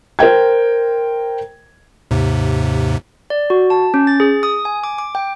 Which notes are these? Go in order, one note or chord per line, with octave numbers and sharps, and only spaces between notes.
A#4 C5 G5 G#6
D#2 G#2 C3
D5
F#4
A5
C#4
A6
G#4
D#6
G#5
D6
D6
G5